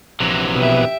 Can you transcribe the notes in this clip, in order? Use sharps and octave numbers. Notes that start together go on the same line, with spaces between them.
A#1 C3 E3 F#3 A#5
B2 G4 B4 E5 D#6